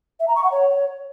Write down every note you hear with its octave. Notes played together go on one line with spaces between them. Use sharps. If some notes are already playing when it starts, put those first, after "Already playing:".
E5
A#5
C#6
F#5
C#5